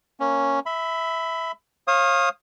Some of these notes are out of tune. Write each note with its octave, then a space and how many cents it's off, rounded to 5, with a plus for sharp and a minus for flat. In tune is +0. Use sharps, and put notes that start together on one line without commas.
A#3 -5 C#4 +0
E5 -10 B5 +20
C#5 -40 F5 +0 D#6 +0